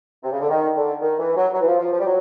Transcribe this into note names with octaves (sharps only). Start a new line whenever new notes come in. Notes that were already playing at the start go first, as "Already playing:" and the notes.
C3
C#3
D3
D#3
D3
D#3
E3
F#3
F#3
E3
F3
F3
F3
G3
F#3